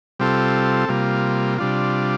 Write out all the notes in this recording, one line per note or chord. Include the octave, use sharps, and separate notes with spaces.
C3 G3 C4 F4 A4
C3 G3 A#3 F4
C3 G3 D4 F4